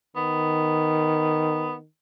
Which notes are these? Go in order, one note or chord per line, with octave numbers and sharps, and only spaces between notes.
D#3 B3